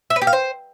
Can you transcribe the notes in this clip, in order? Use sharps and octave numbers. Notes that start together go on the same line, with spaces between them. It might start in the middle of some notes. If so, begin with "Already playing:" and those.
E5
B4
G4
F5
C5